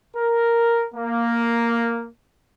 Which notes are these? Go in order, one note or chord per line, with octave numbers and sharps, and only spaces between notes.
A#4
A#3